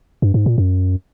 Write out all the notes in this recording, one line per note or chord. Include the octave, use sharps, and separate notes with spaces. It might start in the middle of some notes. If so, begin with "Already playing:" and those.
G2
G#2
A#2
F#2